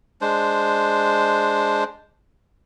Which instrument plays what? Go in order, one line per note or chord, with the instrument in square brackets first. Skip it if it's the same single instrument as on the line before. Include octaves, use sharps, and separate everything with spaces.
[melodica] G#3 D4 C5